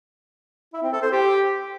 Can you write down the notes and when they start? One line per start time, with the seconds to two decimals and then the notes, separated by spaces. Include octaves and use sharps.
0.73 E4
0.83 C4
0.93 A4
1.02 C5
1.12 G4